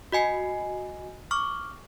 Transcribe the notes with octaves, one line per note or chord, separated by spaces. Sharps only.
F#4 D#5 G#5 C7
C#6 D6 F6